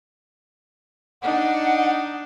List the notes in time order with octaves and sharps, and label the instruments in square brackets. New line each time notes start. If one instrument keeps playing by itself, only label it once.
[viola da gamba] D4 D#4 [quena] F#5